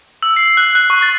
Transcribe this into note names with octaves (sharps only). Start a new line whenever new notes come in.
E6
C7
F#6
F#6
C#6
A6